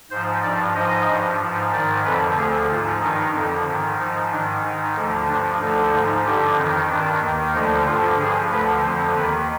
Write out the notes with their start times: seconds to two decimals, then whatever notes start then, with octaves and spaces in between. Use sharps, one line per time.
0.11 G#2 F3 C5
0.43 G2 F3 D5
0.75 G#2 F3 D#5
1.07 G2 F3
1.40 G#2 F3
1.72 G#2 D#3 D5
2.04 F2 D3 F3 B4
2.37 D2 D3 F3 G#4
2.69 G#2 F3 F4
3.01 G2 D#3 D#4
3.34 F2 D3 F3
3.66 G#2 D#3
3.99 G#2 F3 D#4
4.31 G#2 D#3 D4
4.63 G#2 D#3 D#4
4.95 D2 D3 F3
5.28 G2 F3 D4
5.60 D2 D3 F3 D#4
5.92 G#2 F3 D#4
6.25 G2 D3 F3 G4
6.57 F2 D#3 D#4
6.90 G2 D#3 D4
7.22 D#2 D#3
7.54 D2 D3 F3 D#4
7.86 G2 D3 F3 F4
8.19 G2 F3 G#4
8.51 D2 D3 F3 B4
8.83 F2 D3 F3 C5
9.16 D#2 D#3 B4